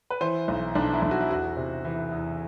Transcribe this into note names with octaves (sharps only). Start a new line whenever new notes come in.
B4
E3 C5
B1
B1 D4
E4
B1
F#4
E4
E2 F#4
C3
E3
E2